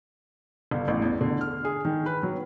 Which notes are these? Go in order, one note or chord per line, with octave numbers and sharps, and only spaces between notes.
G1
A1
E2
D3
F6
G#4
D#3
B4
F#3